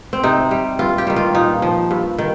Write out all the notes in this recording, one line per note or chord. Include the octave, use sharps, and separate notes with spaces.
C4
C3 D#4
G3
G2 F4
G4
D#3 G3
F4
A#2 D#4
F3
G2
D#3